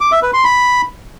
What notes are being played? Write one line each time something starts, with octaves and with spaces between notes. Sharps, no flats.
D6
E5
B4
C6
B5